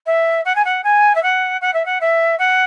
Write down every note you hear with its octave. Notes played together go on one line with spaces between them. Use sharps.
E5
F#5
G#5
F#5
G#5
E5
F#5
F#5
E5
F#5
E5
F#5